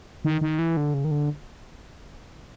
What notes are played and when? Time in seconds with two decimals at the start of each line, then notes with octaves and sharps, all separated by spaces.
0.25 D#3
0.41 D#3
0.59 E3
0.77 D3
0.94 C#3
1.04 D#3
1.11 D3